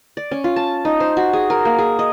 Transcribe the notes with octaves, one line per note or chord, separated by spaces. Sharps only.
D5
C#4
F4
A5
D#4
C5
F#4
G#4
A#4
A#3
G#4
D#5